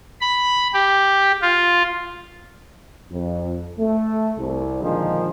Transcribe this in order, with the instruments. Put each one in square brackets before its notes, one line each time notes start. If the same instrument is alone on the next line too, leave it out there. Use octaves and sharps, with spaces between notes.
[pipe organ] B5
G4
F4
[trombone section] F2
A3
C2
A#2 D3 D#3 F3 G#3